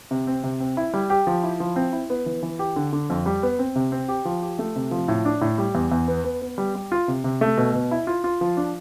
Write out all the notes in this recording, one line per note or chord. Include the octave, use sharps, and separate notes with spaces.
C3
C4
C3
C4
E4
G3
G4
F3
E4
F3
C4
E4
B3
E3
E3
G4
D3
D3
F2
G3
B3
C4
C3
C4
G4
F3
G4
A3
C3
F3
A2
D4
A2
G3
E2
E2
B3
B3
B3
G3
G3
F4
C3
C3
A3
B2
B2
E4
F4
F4
F3
D4